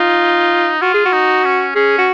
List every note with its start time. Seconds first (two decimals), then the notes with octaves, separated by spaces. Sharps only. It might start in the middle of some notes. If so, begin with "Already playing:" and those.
Already playing: D#4 F4
0.82 F4 F#4
0.94 G#4
1.05 F#4
1.13 D#4
1.45 C#4
1.75 C#4 G#4
1.98 F#4